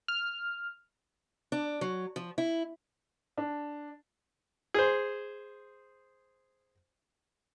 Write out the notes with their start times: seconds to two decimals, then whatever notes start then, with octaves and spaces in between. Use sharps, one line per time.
0.08 F6
1.52 D4
1.81 F#3
2.16 F3
2.38 E4
3.38 D4
4.74 G#4 C5